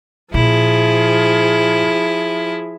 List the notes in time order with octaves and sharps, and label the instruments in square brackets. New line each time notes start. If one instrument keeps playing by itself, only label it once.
[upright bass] A#2 [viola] F3 G#4 [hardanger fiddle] E4